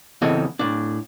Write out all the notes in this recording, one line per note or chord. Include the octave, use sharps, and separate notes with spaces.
E2 C#3 E3 C4 A4 D#5
A2 D4